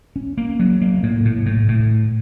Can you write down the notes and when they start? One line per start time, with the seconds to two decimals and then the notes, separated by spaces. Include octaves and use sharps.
0.16 C#4
0.38 A#3
0.59 F#3
0.81 A#3
1.03 A2
1.25 A2
1.46 A2
1.68 A2